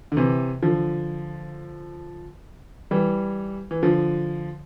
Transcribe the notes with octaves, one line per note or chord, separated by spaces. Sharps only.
D3
C3 E3
D3 F3
E3 G3
E3
D3 F3